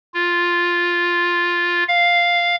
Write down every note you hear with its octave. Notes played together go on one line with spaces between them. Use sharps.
F4
F5